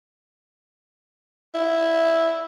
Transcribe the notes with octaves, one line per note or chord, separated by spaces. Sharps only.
E4